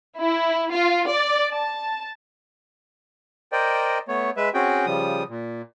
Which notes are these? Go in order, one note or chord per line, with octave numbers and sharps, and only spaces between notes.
E4
F4
D5
A5
A#4 C5 D5 D#5 G5
A3 B3 C#5
G#3 B4 E5
C4 C#4 F#4 G#4 G5
C#3 F3 G3 D#6
A#2